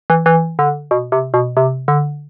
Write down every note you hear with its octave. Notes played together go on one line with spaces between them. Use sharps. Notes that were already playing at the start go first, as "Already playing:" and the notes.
E3
E3
D3
B2
C3
B2
C3
D3